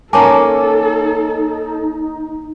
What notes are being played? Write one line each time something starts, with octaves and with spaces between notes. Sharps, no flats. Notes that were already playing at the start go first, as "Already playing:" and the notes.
A#3 C#4 D#4 A4 A#4 G#5 A5 D6